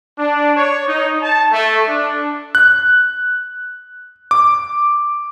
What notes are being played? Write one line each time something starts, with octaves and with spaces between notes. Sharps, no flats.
D4
C#5
D#4
A5
A3
D4
F#6
D6